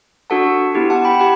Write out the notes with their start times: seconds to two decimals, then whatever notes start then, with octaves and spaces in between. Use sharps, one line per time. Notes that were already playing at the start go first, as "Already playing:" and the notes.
0.30 D4 F#4 A4 F#5 A5
0.75 B3 E4 G4
0.90 F#5 A5
1.05 G5 B5
1.20 G4 F#5 A5